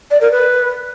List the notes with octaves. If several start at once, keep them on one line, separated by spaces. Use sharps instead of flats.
D5
A#4
B4